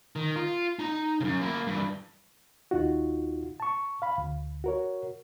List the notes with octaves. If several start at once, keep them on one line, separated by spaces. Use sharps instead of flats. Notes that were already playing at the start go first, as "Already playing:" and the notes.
D#3
F4
D#4 A#5
F#2 C#3
A#3 E4
G2 E3
D#2 D#4 F4 F#4
A5 C#6
F5 B5
D2
F#4 A#4 C#5